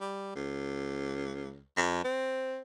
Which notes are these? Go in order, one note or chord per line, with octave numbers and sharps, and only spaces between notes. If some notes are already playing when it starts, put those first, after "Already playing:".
G3
C#2
F2
C4